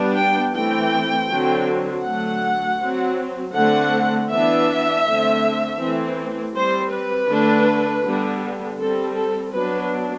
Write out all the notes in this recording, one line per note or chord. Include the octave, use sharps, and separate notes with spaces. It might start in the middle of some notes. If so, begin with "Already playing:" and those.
Already playing: G3 B3 D4
G5
E3 A3 C4 G5
D3 F#3 C4
D3 F#3 A3 F#5
F#3 C4
D3 A3 C4 F#5
E3 B3 D4 E5
D3 A3 C4
E3 A3 C4
G3 C4 C5
B4
D3 A3 D4
D3 G3 B3
G3 C4 A4
A4
F#3 B3 D4 B4